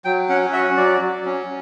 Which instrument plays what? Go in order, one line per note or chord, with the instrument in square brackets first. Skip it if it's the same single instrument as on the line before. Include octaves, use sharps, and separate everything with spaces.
[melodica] F#3 G5
C#4 F#5
F#4 E5
F#3 D5
F#3
C#4